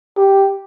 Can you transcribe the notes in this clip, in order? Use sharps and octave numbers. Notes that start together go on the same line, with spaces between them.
G4